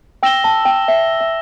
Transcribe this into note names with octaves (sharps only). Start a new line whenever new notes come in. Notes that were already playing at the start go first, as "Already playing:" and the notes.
G5 E6 A#6 E7 G7
A5
G5
E5
E5